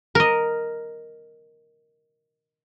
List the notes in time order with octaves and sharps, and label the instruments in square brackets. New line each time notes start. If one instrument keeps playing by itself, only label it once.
[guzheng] A#4 D#5